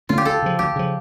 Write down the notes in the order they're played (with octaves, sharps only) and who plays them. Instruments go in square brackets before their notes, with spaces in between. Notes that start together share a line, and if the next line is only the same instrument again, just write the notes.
[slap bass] D3 A3 C#4 [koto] F4
[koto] G4
[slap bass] D2 [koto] A4
[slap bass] C#3 F3
[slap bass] D2 [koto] G4
[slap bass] C#3 F3